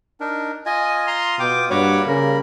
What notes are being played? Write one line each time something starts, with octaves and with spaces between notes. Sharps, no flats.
D4 D#4 A#4
F4 D#5 G#5 D#6
A#5 C6
B2 G5 D6
G2 G3 A#3 F#4 C#5 B5 D6
C#3 A#4